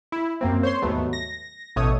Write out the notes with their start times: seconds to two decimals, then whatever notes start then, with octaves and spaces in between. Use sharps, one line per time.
0.12 E4
0.41 F#2 A#3 C4
0.63 C5 C#5 C6
0.82 D#2 G#2 F#3 A3 B3
1.13 A#6
1.76 A1 B2 A3 C#5 D#6